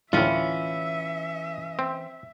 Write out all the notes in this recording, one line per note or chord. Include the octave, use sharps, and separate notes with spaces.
D2 A2 E3 C#4 E4 F4 E5
C4